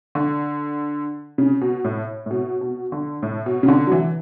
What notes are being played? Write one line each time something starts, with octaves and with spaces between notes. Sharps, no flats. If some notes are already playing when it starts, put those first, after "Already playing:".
D3
C#3
B2
A2
A2
B2
B2
D3
A2
B2
C#3
D3
F#3
E3